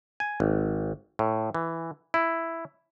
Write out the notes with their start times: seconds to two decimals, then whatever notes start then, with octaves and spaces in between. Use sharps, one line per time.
0.20 G#5
0.40 G#1
1.19 A2
1.55 E3
2.14 E4